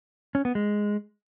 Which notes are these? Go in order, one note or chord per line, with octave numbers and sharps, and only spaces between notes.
C#4
B3
G#3